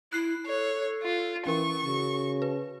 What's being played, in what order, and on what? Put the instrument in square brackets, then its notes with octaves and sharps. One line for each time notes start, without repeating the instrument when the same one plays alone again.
[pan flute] E4 [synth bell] F#6 C7
[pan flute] A4 [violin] C#5
[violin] F4
[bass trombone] E3 [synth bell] C#4 A#4 [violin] C#6
[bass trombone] C#3 [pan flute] F#4
[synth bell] B4